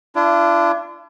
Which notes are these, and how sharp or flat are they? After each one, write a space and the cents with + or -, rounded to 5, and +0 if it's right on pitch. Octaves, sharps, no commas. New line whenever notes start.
D4 +0 F4 -45